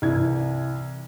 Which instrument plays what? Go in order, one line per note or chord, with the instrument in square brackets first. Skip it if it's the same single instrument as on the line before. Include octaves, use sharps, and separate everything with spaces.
[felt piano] C2 E3 G#6